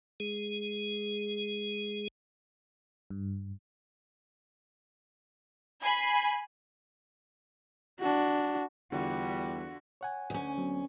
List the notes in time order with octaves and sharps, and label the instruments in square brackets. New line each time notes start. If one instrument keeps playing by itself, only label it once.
[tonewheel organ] G#3 G#4
[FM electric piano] G2
[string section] G#5 B5 C7
[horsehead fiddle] D4 F#4
[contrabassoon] E2 [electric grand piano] D3 F4 [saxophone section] G3 [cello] F#4
[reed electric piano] C#5 F#5 G#5
[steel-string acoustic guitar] D2 C#4
[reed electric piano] F#3 B3 C4